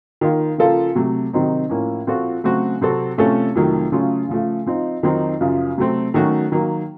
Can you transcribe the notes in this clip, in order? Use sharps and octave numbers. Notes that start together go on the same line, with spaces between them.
D#3 A#3 F4
C#3 F3 A#3 F4 A4
C3 F#3 A3
C3 D#3 F#3 C4 D#4
A2 F3 A#3 C#4
A#2 F3 C4 F#4 A4
C#3 F#3 A3 C4 F#4
C3 F#3 C4 F#4 A4
C3 F3 A3 C#4 A4
F2 C3 D#3 F#3 A3
C#3 F#3 A3 C#4 F4
C#3 F3 A3
F3 C4 D#4
F2 D#3 F#3 C4 D#4
F#2 C#3 F3
C3 F#3 A3 C4
D#3 F#3 A3 C#4 F#4
D#3 F#3 A#3